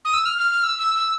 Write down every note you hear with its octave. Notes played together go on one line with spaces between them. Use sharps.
D#6
E6
F6
F6
F6
E6
E6
E6